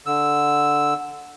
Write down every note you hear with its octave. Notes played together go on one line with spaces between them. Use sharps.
D3 E6